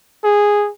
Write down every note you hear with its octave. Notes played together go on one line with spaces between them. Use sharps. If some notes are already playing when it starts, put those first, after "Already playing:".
G#4